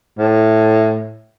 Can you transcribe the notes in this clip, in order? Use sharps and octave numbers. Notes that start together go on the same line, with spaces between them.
A2